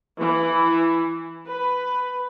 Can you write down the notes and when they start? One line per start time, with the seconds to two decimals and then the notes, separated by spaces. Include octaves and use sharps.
0.17 E3
1.46 B4